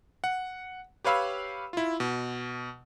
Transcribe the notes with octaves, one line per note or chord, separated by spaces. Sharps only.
F#5
G4 B4 C#5 F5 B5 E6
E4 F4
B2